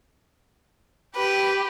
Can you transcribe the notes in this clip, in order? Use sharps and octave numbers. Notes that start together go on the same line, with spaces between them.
G4 B4